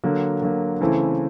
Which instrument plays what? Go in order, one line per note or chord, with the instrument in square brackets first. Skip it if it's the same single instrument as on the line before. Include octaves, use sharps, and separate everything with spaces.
[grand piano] D3 F#3 A#3
D3 F#3 A#3
C#3 E3 A3 C4 E4